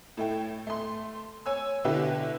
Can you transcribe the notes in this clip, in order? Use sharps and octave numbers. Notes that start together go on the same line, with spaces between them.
A2 A3 G5
A3 C6
C#5 G#5 E6
B2 D3 E4 G4 A4 B4